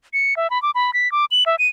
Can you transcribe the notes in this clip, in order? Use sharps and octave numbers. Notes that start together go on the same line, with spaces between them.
C#7
E5
B5
D6
B5
B6
D6
F#7
E5
D#7